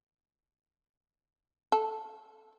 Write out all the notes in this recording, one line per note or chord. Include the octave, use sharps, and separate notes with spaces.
A4